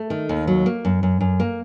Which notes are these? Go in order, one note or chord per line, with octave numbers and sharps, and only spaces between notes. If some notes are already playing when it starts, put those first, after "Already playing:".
Already playing: A3
D#3
D#2
F#3
A#3
F#2
F#2
F#2
A#3